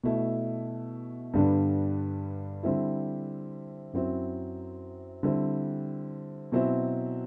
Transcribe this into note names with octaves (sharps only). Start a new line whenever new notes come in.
B2 A3 E4
G2 D3 G3 B3 D4
D3 G3 C4 E4
F#2 F#3 C4 E4
D3 G3 C4 E4
B2 F#3 C4 E4